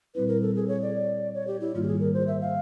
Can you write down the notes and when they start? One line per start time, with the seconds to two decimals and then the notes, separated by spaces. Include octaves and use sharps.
0.15 A#2 G3 C4 E4 B4
0.28 A#4
0.42 A4
0.55 G#4
0.68 C#5
0.82 D5
1.34 C#5
1.48 G4
1.60 E4
1.75 G#2 D#3 G3 A#3 F4
1.83 G4
1.87 G#4
2.00 A#4
2.13 C5
2.27 E5
2.41 F5